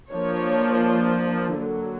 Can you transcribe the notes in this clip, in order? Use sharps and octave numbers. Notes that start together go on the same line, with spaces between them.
F3 A#3 D4 C#5
D3 F#3 A#3